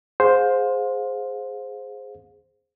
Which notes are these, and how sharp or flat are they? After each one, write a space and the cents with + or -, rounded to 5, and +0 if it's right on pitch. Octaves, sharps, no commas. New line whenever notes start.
G#4 +0 C5 +0 F5 +35